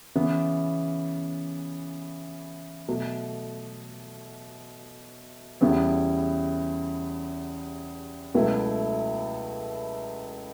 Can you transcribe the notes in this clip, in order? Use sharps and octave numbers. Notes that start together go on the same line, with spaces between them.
C#3 E3 B3
B2 F#3 A3
E2 C#3 G3 B3 E4
C#2 B2 F#3 A3 E4